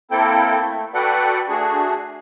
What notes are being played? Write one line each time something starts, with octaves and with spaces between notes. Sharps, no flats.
A#3 C4 E4 A4 G5
A3
F#4 A4 B4 D5 F#5 G5
A3 D4 F#4 G#4